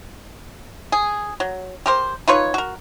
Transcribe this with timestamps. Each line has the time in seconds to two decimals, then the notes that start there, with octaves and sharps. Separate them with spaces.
0.92 G#4
1.40 F#3
1.86 G4 A#4 C5
2.28 D#4 F4 B4 C#5
2.54 F#4 A#4